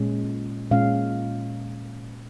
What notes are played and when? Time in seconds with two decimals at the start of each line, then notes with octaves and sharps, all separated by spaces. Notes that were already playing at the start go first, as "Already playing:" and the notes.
Already playing: A#2 G#3 C#4
0.71 A#2 G#3 C#4 F5